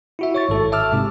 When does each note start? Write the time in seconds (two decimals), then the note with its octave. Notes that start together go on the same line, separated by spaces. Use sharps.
0.19 E4 F#4 E5
0.35 C#5 C#6 A6
0.49 G#1 G#2 A4
0.72 E5 A5 D6 E6 F6
0.93 G#2 C3